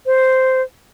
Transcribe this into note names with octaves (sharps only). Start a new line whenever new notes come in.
C5